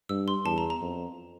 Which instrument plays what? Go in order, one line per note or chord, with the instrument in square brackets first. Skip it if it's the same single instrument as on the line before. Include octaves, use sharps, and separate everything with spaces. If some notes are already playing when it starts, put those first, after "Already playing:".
[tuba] G2 [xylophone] E6
[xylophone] C6
[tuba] E2 [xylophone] A5
[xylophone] A#5
A#5
[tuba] F2